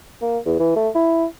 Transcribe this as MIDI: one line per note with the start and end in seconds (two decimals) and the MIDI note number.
0.22 0.38 58
0.46 0.59 40
0.60 0.75 52
0.76 0.89 57
0.95 1.25 64